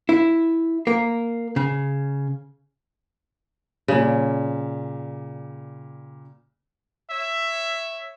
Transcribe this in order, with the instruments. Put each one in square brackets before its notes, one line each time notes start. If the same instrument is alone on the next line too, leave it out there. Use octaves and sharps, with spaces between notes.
[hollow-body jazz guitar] E4
A#3
C#3
[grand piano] A#2 G3 [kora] C#3
[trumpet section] C#5 E5